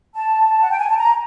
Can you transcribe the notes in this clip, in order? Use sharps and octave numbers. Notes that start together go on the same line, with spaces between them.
A5
F#5
G5
G#5
A5
A#5